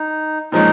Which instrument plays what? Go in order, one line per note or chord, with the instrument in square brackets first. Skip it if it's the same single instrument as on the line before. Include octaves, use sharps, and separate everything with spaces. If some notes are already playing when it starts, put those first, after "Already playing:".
Already playing: [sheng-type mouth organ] D#4
[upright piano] A#2 F3 G#3 C#4 [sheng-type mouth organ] D#4